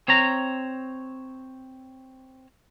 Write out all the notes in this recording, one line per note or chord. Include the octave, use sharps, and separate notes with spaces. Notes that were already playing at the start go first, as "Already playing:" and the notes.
C4 C#5 A#5